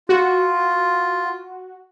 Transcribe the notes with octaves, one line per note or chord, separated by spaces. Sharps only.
F4 F#4